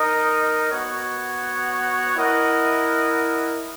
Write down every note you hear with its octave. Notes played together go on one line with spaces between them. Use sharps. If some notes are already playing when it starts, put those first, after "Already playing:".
Already playing: D#4 A#4 D#5
B3 F#4 C#5 F#5
E4 A#4 D#5 F#5